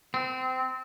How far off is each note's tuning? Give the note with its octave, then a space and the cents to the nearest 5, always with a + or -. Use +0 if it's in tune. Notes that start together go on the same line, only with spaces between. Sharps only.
C4 -25